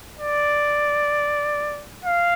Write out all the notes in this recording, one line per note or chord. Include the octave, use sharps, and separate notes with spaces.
D5
F5